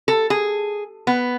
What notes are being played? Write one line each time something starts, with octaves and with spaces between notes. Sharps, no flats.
A4
G#4
B3